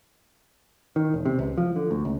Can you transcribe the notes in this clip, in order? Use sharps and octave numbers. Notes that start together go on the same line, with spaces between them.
D#3
E1
C3
C#2
F3
D3
D2
C#2